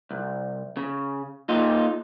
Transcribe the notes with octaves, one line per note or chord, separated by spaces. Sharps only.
C2
C#3
A#2 D#4 F4